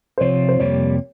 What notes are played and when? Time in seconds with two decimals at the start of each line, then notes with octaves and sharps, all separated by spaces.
0.18 C5
0.20 C3 F3 C4 F4 C#5
0.49 C5
0.59 F2 C3 G3 A#3 C#5